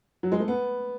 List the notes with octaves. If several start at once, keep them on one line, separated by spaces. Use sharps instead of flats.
F#3
G#3
A3
B3